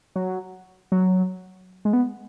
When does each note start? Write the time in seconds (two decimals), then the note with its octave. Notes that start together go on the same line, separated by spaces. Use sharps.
0.16 F#3
0.92 F#3
1.85 G#3
1.93 B3